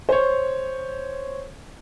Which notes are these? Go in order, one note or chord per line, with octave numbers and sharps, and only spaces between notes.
C5 C#5